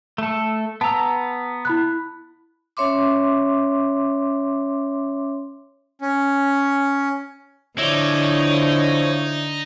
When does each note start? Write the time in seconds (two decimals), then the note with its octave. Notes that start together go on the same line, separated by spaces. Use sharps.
0.18 A3 A4
0.81 B3 A5 A#5 E6
1.65 E4 B5 F#6
2.77 C#4 C#5 E5 C6 D6
6.02 C#4
7.79 D3 F3 D#4 E4 C#5 D5